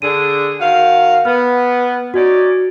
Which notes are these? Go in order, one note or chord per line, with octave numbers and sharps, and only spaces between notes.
D3 G#4 D#7
D#3 F#4 F5
B3 F6
C#4 D#4 F#4 D5